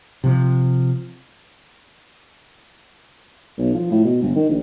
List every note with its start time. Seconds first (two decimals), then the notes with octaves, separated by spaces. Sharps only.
0.24 C3 F3
3.58 B1
3.74 F3
3.90 A2
4.04 B2
4.22 G1
4.35 D#3
4.49 A#1